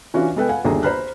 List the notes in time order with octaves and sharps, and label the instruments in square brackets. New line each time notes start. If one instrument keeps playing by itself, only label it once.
[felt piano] E3 C#4 D4 F4 F#4
G#3 B3 A4 B4 D#5 G5
B4 F5 F#5 G#5
G1 D#2 D4 G#4 A4 A#5
C5 A#5 B5 F6 F#6